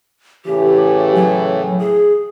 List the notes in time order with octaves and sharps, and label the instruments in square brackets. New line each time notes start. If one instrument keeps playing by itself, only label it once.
[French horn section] A2 C#3 E3 [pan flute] G4
[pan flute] F#3
G#4